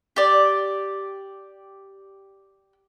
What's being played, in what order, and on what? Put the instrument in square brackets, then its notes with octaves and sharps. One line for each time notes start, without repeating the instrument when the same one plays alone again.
[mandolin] G4 D5